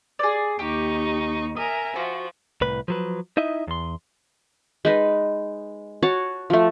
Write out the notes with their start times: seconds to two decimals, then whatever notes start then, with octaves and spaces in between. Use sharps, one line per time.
0.19 G#4 D5
0.59 D#2 D#4 G4 C#6
1.56 A#4 E5 G#5 D#6
1.96 F3 F#4
2.61 C2 A2 B4
2.88 F3 F#3 B4
3.37 D#4 E4 D#5 E5
3.67 E2 C6
4.85 G#3 D#4 B4
6.02 F#4 C#5 A5
6.50 F3 A3